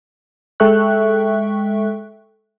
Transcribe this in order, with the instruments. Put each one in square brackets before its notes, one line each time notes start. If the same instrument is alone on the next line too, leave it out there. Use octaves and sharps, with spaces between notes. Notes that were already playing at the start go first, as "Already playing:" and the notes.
[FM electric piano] G#3 A4 E5 G5 C#6 F#6